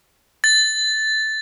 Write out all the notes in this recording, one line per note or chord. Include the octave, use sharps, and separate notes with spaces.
A6